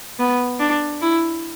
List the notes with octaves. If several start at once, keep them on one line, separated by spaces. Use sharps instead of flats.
B3
D4
E4